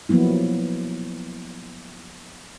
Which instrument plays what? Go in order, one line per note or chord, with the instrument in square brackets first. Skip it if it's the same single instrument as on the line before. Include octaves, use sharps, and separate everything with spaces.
[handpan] F3 F#3 A#3 B3 E4